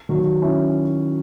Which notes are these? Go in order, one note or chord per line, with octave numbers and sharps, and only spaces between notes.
D#3 F#3
C#4 E4